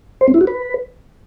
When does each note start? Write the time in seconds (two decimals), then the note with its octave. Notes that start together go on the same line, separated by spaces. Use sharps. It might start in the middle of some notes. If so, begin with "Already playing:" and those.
0.21 C5
0.28 C4
0.34 E4
0.41 F#4
0.47 B4